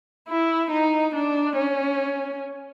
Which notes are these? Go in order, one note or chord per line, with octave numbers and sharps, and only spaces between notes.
E4
D#4
D4
C#4